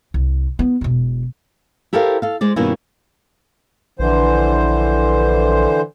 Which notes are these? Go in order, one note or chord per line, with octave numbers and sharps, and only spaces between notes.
C2
B3 E4
E1 B2
E4 G4 A4 A#4 C5 F5
A4 F5
G#3 C5 D5
G2 B2 D#3 A#3 C#4 E4
A#1 D3 E3 C5